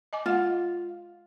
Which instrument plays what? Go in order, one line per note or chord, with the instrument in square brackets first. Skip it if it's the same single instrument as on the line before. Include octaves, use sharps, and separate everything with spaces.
[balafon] D#5 G#5 D6
[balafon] G#3 F#5 [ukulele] F4